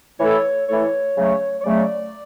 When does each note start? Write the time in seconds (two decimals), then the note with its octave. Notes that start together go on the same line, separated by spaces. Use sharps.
0.19 E3 A3 E4 A4 C#5
0.68 E3 A3 E4 A4 C#5
1.16 C#3 F#3 A3
1.61 C#5
1.64 C#3 F#3 A3 D5